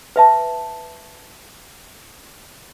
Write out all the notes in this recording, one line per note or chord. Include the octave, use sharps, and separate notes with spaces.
B4 E5 A5